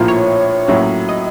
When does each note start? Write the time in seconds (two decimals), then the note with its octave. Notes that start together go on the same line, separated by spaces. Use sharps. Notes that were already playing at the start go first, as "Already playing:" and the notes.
Already playing: A#1 A2 F3 A#3 F4
0.08 C#5
0.68 A2 F#3 A#3 C#4 F#4
1.09 D#5